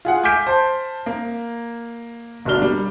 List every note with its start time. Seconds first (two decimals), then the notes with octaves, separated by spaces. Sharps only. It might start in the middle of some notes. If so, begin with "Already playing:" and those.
0.05 F4 G#4 F#5
0.23 G#5 D6 F6 G6 B6 D7
0.47 C5 A5
1.06 A#3
2.45 G1 B2 A#3 D4 F6 G7
2.62 G3